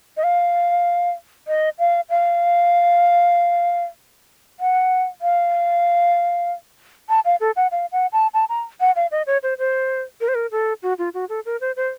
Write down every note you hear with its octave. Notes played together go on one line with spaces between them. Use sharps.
D#5
F5
D#5
F5
F5
F#5
F5
A5
F5
A4
F#5
F5
F#5
A5
A5
A#5
F#5
F5
D#5
C#5
C5
C5
A#4
C5
A#4
A4
F#4
F4
F#4
A4
A#4
C5
C5